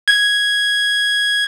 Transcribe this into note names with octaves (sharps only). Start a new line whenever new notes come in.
G#6